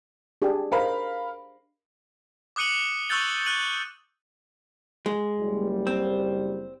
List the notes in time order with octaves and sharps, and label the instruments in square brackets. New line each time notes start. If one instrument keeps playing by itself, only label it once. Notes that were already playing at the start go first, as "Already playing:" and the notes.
[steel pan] D4 G4 G#4
[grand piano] A#4 F5 B5 [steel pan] C5 D#5
[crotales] D6 D#6 F#6 C#7 D#7 F#7
C#6 E6 F#6 G6 A6 G7
F#6 G6 D#7 F#7
[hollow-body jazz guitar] G#3
[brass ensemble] F#1 G3
[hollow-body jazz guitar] C4